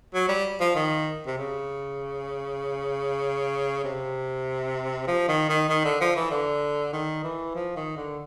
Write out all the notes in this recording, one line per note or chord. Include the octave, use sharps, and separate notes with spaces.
F#3
G3
F3
D#3
C3
C#3
C3
F3
D#3
D#3
D#3
D3
F3
E3
D3
D#3
E3
F3
D#3
D3